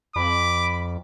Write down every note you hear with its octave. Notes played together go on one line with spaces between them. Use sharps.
F2 B5 D6